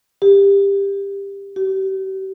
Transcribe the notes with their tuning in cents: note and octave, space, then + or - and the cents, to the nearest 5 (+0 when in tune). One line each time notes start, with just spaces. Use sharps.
G4 +20
G4 -40